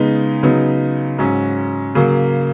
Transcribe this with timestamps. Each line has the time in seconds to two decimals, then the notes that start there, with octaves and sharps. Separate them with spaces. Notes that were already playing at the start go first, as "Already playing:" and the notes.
Already playing: C#3 G#3 B3 D#4
0.43 C#3 F#3 B3 D#4
1.18 G#2 F#3 C#4
1.95 C#3 F#3 A#3